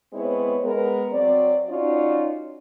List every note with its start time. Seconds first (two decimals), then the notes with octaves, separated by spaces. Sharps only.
0.13 G#3 B3 C4 E4 C#5
0.63 G#3 B3 A#4
1.13 F#3 C4 D5
1.70 C#4 D#4 F4 F#4 C#5 D5